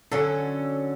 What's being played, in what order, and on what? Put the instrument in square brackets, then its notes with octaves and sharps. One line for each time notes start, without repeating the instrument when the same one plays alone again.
[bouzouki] D3 F#3 C#4 [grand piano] A4